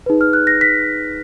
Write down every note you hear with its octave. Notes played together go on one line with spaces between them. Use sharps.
D#4 G#4 B4
F6
F#6
A#6
B6